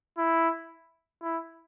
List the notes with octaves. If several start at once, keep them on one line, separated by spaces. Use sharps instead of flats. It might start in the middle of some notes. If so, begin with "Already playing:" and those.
E4
E4